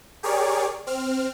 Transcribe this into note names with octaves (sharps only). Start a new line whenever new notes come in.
G4 G#4 A#4 C#5 D5
C4 F6